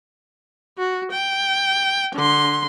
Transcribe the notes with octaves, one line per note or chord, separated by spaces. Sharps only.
F#4
G5
D3 C6